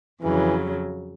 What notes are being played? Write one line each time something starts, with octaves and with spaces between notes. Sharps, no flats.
F2 C#3 E3 F#3